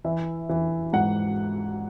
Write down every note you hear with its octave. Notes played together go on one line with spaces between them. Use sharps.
E3 E5
E3
G#2 F#5